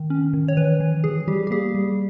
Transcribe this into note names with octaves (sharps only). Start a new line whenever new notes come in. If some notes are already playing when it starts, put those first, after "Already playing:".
Already playing: D#3
C#4
D#3
C#5
E3 B4
E3
E3 G#4
G3 G4
G4
A#3 G#4
G3